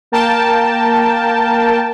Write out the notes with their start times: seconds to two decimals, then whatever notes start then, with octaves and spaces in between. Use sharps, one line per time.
0.12 A#3 A#4 G5 A5